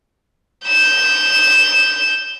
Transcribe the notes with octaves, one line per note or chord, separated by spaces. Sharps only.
G6 E7